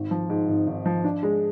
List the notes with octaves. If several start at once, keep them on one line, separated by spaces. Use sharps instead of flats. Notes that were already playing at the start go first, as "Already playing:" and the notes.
Already playing: G#1
F3
G#2
G#1
G#1
F3
D4
G#3